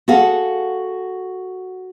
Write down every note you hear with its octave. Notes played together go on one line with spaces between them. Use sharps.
F#4 G#4 A4 F5 F#5